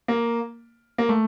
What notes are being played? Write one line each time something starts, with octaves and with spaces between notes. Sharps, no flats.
A#3
A#3
A3